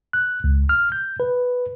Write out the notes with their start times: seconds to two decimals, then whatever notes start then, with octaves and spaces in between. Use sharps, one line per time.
0.13 F#6
0.44 C#2
0.69 F6
0.92 G6
1.20 B4